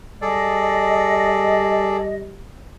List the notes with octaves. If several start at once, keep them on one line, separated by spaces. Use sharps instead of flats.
G3 G#4 A4 D5 D#5